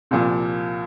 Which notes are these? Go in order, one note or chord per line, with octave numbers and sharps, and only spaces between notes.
C2 A#2 F3